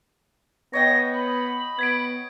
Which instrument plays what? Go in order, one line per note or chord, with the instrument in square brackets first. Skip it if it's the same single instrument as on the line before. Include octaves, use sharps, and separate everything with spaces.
[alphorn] B3 [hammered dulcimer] C#5 D#5 G5 [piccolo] A#6
[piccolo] B5
[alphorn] B3 [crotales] G#6 B6 D7